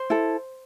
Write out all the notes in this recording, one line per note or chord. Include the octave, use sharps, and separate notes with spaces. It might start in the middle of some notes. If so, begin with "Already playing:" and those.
Already playing: C5
E4 A4